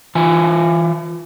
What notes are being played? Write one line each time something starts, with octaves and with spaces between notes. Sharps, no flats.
E3 F4 G#5